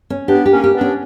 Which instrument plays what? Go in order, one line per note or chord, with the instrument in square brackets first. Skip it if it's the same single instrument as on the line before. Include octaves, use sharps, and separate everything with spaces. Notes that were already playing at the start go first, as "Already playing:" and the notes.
[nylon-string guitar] C#4
[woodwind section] B3 D4 [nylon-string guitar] G4
[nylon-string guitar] G4
[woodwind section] A#3 C#4
[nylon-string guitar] G4
[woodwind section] B3 D4
[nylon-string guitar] C#4